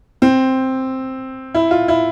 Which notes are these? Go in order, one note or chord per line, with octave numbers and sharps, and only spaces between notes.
C4
E4
F4
E4